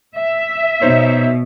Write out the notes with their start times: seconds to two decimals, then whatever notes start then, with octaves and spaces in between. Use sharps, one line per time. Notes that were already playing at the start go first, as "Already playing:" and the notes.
0.17 E5
0.82 B2 D#4 C5 C#5